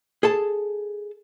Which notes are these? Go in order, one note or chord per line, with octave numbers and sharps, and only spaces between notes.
G#4 A4 A5